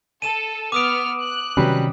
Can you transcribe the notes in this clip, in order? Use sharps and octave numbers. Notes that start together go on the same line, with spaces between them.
A4 D#7 E7
B3 D6 D#6 F6 D7
F#6
C3 D#3 F#3 G3 C#4 B4